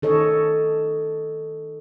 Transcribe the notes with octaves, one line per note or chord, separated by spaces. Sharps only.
D#3 A4 C#5 D#5